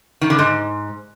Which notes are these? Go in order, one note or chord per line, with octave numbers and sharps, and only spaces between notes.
D#3
D3
G#2